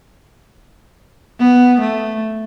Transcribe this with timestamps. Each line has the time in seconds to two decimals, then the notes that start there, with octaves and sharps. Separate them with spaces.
1.39 B3
1.80 A3